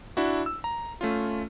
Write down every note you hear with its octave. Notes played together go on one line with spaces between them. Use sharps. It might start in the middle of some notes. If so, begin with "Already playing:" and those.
D4 E4 F#4
E6
A#5
A3 C#4 F4